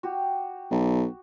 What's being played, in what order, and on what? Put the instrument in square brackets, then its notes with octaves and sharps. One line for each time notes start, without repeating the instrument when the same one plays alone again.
[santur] F#4 G4
[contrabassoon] B1